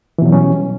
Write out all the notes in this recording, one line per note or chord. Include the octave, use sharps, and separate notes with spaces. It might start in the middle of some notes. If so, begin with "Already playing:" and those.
B2 E3 F#3 G3 C#4